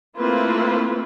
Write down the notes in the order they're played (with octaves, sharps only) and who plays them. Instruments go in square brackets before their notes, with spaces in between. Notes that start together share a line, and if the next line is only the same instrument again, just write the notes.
[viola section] A3 A#3 C4 E4 F4 B4